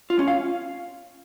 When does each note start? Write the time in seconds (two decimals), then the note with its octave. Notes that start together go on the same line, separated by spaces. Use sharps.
0.10 F4
0.19 C#4
0.28 F5